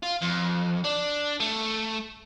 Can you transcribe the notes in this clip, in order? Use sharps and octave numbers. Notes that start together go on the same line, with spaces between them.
F4
F2
D4
A3